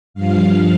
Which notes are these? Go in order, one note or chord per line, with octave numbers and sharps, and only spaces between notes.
G2 F3 F5